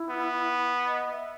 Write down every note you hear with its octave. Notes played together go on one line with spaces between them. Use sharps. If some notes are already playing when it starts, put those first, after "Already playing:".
Already playing: E4
B3
D#5
E5